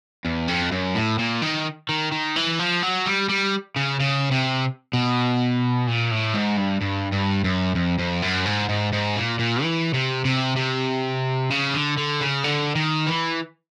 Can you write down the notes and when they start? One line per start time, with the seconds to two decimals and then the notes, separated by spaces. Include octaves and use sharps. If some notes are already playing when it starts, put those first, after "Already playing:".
0.25 E2
0.48 F2
0.71 F#2
0.95 A2
1.19 A#2
1.42 D#3
1.89 D#3
2.12 D#3
2.36 E3
2.59 F3
2.82 F#3
3.06 G3
3.29 G3
3.76 C#3
4.00 C#3
4.31 C3
4.93 B2
5.87 A#2
6.11 A2
6.34 G#2
6.58 G2
6.81 G2
7.12 G2
7.44 F#2
7.75 F2
7.99 F2
8.22 F#2
8.46 G#2
8.69 G#2
8.93 G#2
9.16 A#2
9.39 A#2
9.63 E3
9.94 C3
10.25 C3
10.57 C3
11.50 C#3
11.74 D3
11.97 D3
12.21 C#3
12.44 D3
12.75 D#3
13.07 E3